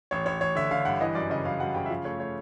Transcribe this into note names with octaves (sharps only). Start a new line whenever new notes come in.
A1 C#5
A1 C#5
A1 C#5
D3 E5
D3 F5
G2 F#5
E3 D#5
F#2 D5
C#3 D#5
F#2 F5
F#2 F#5
C#3 G5
E5
F3 F5
A3 C#5
A3 C#5